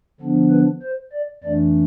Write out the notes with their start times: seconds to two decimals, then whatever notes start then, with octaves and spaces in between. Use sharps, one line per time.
0.20 D3 F3 B3 D4
0.51 B4
0.82 C5
1.13 D5
1.43 F2 E3 A3 D4 D5